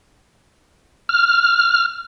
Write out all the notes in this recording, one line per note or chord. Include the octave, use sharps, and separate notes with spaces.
F6